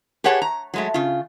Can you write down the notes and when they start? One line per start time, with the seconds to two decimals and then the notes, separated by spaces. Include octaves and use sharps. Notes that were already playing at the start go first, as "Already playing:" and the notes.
0.24 G4 G#4 B4 C#5 F#5 A5
0.42 A#5
0.74 F#3 G#3 A3
0.94 C#3 F4